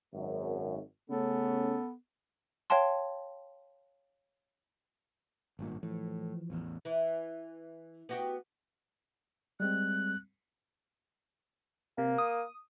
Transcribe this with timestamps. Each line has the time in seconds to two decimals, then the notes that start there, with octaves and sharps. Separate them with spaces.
0.13 G#1 F#2
1.10 C#3 A3 B3 C#4 A4
2.70 C#5 F5 G5 A5 C6
5.59 G#1 G2 A#2
5.83 A2 E3 F3
6.50 A1 E2
6.85 E3
8.09 B3 F#4 G4
9.60 G3 G#3 C4 F#6
11.98 C3 A#3
12.18 D#6